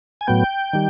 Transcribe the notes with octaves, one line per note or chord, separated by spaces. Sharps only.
G#5
A2 F#3 B3 G5
D#3 G3